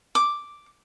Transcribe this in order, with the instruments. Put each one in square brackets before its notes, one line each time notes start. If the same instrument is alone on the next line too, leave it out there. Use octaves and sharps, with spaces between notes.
[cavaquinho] D6